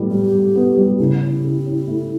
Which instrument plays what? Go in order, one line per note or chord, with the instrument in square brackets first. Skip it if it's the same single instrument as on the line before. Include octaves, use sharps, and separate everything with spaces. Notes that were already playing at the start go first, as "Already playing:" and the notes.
Already playing: [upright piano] A2 G3 B3
[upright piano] G3 [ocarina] G4
[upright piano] G3
B3
G3
[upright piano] C#3 [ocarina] E4
[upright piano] C#4
C#3
C#4
A3